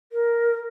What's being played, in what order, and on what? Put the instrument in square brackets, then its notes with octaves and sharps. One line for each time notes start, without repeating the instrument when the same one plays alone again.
[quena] A#4